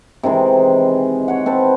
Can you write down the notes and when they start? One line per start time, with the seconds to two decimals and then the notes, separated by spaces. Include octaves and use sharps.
0.23 C3 D#3 E3 G#3
1.28 C#5 F#5
1.46 C4 B4 A5